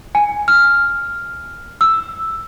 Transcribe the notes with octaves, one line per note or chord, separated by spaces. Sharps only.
G#5
F6
E6